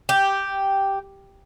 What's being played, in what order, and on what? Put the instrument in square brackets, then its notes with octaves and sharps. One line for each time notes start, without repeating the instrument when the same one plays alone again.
[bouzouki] G4